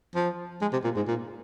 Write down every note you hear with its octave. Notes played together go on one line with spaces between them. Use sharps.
F3
G#3
C3
A#2
G#2
A#2